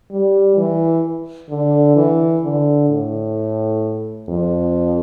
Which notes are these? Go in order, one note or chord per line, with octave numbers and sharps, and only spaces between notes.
G3
E3
D3
E3
D3
A2
F2